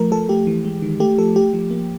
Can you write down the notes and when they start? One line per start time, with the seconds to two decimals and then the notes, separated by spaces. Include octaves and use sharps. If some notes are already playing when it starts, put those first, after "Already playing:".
Already playing: F3 A3 A#4
0.12 F3 A4
0.29 A3 G4
0.47 E3
0.65 G#3
0.82 D#3
1.00 A3 G4
1.18 F3 A4
1.36 A3 G4
1.53 F3
1.71 A#3